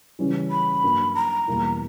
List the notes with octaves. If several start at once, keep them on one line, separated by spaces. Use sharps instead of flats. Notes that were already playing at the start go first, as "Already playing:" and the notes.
C#3 E3 G3 C#4 E4
B5
G2 F#3 A#3
A#5
E2 B2 G3 A#3 E4